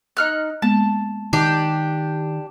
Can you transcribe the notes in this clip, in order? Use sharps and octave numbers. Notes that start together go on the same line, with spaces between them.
D#4 F6 F#6
G#3 A#3 B3 A5
D#3 D4 G4